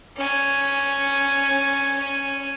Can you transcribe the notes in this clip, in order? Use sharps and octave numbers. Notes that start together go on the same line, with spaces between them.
C#4 G#5